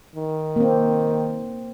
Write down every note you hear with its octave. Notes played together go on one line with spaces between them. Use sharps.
D#3
A#3 C4